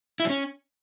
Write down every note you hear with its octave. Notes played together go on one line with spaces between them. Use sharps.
E4
F#3
C#4